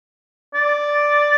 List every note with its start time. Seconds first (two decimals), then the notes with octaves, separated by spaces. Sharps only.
0.54 D5